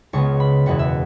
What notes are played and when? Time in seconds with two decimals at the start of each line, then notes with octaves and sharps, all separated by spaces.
0.13 C#2 C#3 G#3 B3 C#6
0.40 B5
0.66 F#1 E2 B2 F#5
0.79 E5